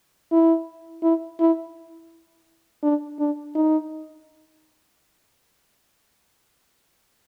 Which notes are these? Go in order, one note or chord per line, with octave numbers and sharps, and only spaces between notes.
E4
E4
E4
D4
D4
D#4